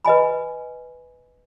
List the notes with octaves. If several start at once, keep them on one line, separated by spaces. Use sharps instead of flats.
B4 D#5 G#5 B5